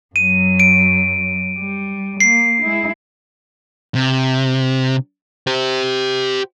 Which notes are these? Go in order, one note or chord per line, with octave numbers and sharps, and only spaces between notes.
F#2 F#3 D#7
D7
G3
A#3 C7
G#3 E4
C3
G4 C5